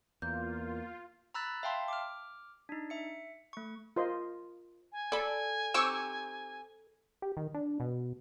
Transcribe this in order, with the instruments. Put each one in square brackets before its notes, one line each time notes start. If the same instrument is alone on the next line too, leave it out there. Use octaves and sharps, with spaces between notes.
[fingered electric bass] E2 [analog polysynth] A#3 [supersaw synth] F4 [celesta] G6
[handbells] A#5 B5 E6 F#6 A6
E5 F5 G5 A5 C6
D6 F6
D4 D#4
E5 C#7
A3 C#6
[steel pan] F4 A#4 C5 D#5 C6
[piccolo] G#5
[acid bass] A4 [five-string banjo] D5 B5
[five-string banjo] C4 D#4 G4 [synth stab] C#6 D6 E6
[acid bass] G4
D#3
D4
B2